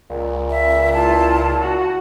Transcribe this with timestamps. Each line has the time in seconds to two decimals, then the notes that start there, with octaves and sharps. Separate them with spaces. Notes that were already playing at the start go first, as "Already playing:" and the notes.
0.10 C#2 A#2
0.50 E5
0.94 E4 F4 A5
1.60 F#4